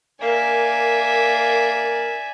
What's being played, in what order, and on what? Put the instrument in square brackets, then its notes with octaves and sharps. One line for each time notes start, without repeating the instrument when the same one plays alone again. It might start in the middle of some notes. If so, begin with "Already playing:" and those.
[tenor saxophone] A#3 [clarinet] A#4 [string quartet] D5 E5 G#5